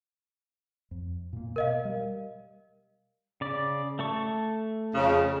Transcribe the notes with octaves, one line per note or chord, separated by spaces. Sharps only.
F2
A#2 A#3
B2 A#4 D#5 F5
G3
C#3 D5
A3 A4 C#6
F2 C#3